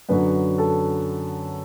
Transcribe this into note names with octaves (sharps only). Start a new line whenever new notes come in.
F#2 D3 F#3 B4
A4